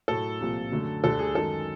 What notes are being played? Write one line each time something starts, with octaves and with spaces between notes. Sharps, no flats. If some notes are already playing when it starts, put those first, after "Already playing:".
A2 F#3 A3 A4
C2 A#2 F3
F#2 D3 F#3 A3
D2 D3 G3 A4
G#4
F#2 D#3 G#3 A4